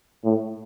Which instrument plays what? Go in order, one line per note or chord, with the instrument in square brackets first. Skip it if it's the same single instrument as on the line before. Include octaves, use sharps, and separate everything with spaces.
[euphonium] A2